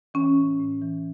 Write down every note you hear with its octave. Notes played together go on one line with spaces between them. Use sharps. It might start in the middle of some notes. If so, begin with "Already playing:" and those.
E3 C#4
A2
A2
E3